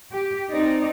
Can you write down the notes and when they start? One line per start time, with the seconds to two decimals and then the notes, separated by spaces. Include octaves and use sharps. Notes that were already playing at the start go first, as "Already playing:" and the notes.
0.12 G4
0.49 C4 D#4 D5